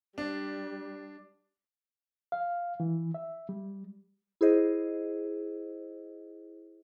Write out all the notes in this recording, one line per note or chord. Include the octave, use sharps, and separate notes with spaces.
G3 D4
F5
E3
E5
G3
E4 G#4 C5 D#5